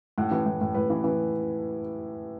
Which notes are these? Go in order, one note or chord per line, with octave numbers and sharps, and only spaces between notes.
A2 F#5
E3
A2
A2
A2 B4
E3
E3